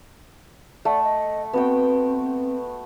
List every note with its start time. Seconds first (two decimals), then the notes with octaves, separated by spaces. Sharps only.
0.85 A3 D5 F#5
1.04 D#5
1.53 B3 C4 F#4 G5